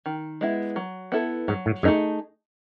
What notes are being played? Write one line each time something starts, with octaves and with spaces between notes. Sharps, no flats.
D#3
G#3 B3 E4
F#3
B3 E4 A4
G#2 F#3
A2
F#2 A3 D#4 G#4